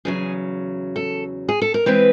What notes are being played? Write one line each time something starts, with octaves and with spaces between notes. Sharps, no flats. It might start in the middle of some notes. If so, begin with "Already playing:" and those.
E2 C#3 F#3 G#4
A4
G#4
A4
A#4
E3 G#3 C4 B4